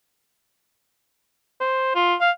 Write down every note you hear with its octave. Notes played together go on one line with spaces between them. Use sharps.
C5
F4
F5